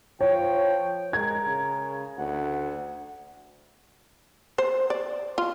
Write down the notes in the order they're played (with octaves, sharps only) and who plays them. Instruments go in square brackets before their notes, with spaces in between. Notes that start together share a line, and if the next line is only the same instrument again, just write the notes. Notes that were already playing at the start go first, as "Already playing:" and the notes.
[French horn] F3 [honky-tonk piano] C#5 [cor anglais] G5
[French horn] G#3 [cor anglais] A#4 [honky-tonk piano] G#6
[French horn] C#3
[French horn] D2 [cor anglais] F#5
[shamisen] C5
D5
F4